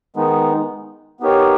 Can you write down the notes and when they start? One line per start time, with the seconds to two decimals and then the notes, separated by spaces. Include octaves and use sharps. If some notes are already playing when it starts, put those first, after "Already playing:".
0.16 D#3 G#3 B3 D#4
1.20 B3 D#4 G4 A#4 C#5